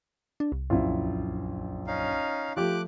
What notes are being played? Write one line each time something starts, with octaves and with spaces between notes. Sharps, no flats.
D4
C2
A#1 F#2 E4 F4
C#4 D#4 F5
F3 A3 F4 G4 D6 F#6